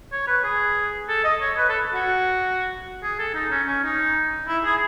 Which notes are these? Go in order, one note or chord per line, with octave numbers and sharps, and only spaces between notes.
C#5
B4
G#4
A4
D#5
C#5
B4
A4
F#4
G#4
A4
D#4
C#4
C#4
D#4
E4
G#4